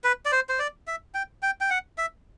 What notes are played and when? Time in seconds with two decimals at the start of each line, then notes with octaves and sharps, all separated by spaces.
0.04 B4
0.25 D5
0.32 C5
0.49 C5
0.59 D5
0.87 E5
1.14 G5
1.43 G5
1.61 G5
1.70 F#5
1.98 E5